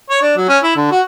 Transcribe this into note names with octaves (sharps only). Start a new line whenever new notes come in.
C#5
D4
F#3
C#4
E4
D3
F#4